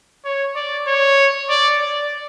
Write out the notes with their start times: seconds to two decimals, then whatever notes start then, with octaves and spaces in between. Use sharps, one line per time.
0.25 C#5
0.56 D5
0.87 C#5
1.49 D5
1.80 D5